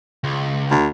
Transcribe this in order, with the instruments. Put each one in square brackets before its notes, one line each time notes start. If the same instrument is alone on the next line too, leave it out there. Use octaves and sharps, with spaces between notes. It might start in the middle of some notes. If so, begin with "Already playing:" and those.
[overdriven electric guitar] C#2
[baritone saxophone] D2